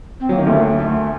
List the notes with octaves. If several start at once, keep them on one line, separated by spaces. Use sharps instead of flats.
C4
F#3 A#3
D#3
D2 D3 A3
A3